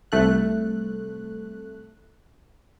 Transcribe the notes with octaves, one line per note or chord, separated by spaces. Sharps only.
C2 A3 F#6